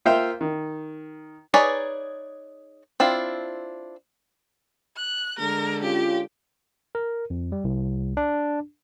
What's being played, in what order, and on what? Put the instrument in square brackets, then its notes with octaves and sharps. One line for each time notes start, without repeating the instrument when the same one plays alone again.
[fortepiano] A#3 F4 C5 E5 F5 G5
D#3
[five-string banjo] D#4 G#4 B4 C#5 D5
C4 D4 E4 F4
[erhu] F#6
[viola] D3 G#3 [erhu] A#4
[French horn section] C#4 F4 [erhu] G4
[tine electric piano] A#4
F2
G3
C2
D4